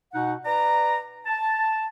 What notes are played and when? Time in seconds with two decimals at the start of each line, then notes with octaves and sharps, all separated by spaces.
0.14 B2 D#4 F#5
0.46 B4 D5 A#5
1.26 A5